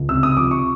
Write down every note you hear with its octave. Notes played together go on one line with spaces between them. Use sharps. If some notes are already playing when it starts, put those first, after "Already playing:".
Already playing: C#2
C3 E6
D#6
F3 D6
C#6